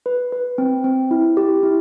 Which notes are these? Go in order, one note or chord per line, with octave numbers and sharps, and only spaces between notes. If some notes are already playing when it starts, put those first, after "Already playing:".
B4
B4
C4
C4
E4
G4
E4